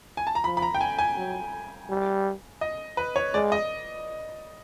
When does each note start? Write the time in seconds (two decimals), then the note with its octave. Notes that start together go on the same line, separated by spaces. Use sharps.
0.17 G#5
0.27 A5
0.35 A#5
0.44 F3 B5
0.57 B5
0.62 A#5
0.74 G5
0.81 G#5
0.99 G#5
1.17 F#3
1.89 G3
2.61 D#5
2.97 B4
3.16 C#5
3.34 G#3 D5
3.52 D#5